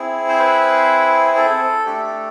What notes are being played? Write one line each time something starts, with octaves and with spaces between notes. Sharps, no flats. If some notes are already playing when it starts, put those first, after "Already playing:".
Already playing: C4 E4 G#4
C5
B4
A4
A3 D4 G4